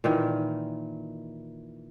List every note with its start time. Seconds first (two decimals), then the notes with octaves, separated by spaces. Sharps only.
0.04 A#2 D#3 E3